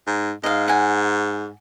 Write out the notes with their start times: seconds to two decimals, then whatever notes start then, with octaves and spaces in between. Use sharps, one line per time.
0.07 G#2
0.43 G#2 D#5 F5
0.68 F#5 G#5